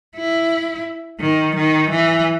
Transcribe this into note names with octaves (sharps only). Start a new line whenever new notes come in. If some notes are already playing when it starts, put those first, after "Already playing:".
E4
D#3
D#3
E3